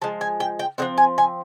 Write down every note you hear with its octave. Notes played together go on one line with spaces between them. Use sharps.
F3 G#3 A5
G#5
G5
G5
F3 G#3 C4 F#5
G#5
G#5